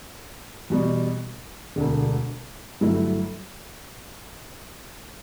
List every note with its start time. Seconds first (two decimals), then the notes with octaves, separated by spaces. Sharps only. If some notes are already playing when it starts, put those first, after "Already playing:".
0.70 E2 B2 G3
1.76 E1 D2 D3
2.81 G1 G2 F#3 A3 E4